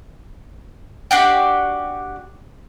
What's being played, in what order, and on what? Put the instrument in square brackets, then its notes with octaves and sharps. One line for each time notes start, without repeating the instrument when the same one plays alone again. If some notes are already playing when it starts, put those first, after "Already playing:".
[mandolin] D4 F#4 G4